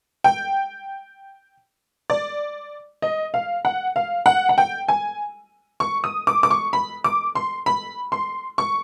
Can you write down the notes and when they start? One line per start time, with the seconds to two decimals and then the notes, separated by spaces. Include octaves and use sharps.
0.24 G5
2.10 D5
3.02 D#5
3.34 F5
3.65 F#5
3.96 F5
4.26 F#5
4.49 F#5
4.58 G5
4.88 G#5
5.80 C#6
6.04 D#6
6.27 D6
6.43 D6
6.51 C#6
6.73 B5
7.04 D6
7.35 C6
7.66 B5
8.12 C6
8.58 C#6